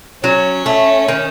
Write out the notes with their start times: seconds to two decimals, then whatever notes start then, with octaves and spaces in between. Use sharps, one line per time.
0.24 F#3 C#4
0.66 A3
1.08 D#3